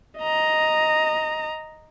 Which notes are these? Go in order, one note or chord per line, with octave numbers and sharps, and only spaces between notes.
D#5 A#5